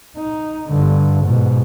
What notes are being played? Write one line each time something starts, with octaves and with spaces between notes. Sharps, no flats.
D#4
G2 D3
G#2 B2